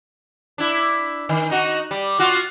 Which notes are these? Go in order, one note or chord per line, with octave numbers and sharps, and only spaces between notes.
D4 E4
D#3
D#4 F#4
G3
F4 F#4